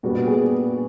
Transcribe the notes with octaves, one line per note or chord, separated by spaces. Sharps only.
A#2 G3 B3 D4 F#4
G#4